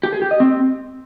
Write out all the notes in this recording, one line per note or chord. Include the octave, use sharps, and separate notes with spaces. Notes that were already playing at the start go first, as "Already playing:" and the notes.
G4
G#4
G4
D#5
C4